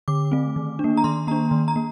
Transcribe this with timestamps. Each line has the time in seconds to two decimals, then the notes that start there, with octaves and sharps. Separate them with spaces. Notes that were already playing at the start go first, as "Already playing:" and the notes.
0.08 D3 D6
0.31 A3 C4
0.56 D#3
0.79 D4
0.84 A#3
0.97 A#5
1.04 D#3 C6
1.27 A#3 D4 A#5
1.51 D#3
1.68 A#5
1.76 A#3